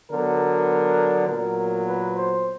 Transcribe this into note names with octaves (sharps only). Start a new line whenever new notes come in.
D3 F#3 B3 A#4
A#2 F#3 B3 A#4
B4
C5